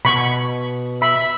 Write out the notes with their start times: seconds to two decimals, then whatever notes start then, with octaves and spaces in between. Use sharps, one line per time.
0.05 B2 B5 C#6
1.02 E5 B5